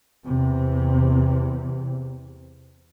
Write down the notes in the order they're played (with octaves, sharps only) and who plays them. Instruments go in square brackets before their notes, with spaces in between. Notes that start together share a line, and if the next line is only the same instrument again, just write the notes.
[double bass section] E2 C3